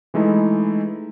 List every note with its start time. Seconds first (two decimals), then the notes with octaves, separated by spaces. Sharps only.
0.14 E3 G#3 A3 D#4 E4